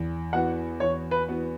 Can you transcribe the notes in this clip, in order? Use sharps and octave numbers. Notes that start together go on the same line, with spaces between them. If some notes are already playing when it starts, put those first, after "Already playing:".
Already playing: E2
E3 B3 F#4 F#5
E2 C#5
B4
E3 B3 F#4